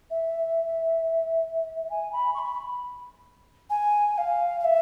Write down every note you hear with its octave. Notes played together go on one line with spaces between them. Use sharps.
E5
G#5
B5
C#6
B5
G#5
G#5
F5
F5
E5